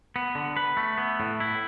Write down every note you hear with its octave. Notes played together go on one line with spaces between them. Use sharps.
B3
D3
B4
A3
B3
A2
E4